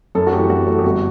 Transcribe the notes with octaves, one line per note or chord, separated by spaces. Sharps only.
F#2 A4
F#4
E3 A3 G4
F#2 F#4
E3 A3
G4
G1 F#4